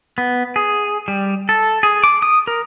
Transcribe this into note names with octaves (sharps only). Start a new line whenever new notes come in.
B3
G#4
G3
A4
G#4
D6
D#6
A#4